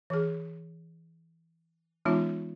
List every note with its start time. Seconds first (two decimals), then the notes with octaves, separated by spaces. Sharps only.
0.10 E3 G#4
2.05 E3 G#3 B3 C#4 D#4 F4